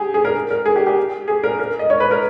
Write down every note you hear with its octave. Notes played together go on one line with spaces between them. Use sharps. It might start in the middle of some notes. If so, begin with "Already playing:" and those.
Already playing: G4 G#4
G#4
A#4
A#4
G#4
G4
G4
G#4
A#4
A#4
D#5
C#5
B4
A#4